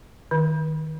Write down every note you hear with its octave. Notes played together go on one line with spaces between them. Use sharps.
D#3